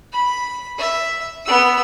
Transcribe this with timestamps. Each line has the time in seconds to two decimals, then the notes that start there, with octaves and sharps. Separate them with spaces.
0.13 B5
0.78 E5
1.45 B3 E6